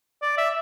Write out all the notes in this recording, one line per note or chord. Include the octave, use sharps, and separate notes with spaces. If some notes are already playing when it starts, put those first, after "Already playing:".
D5
E5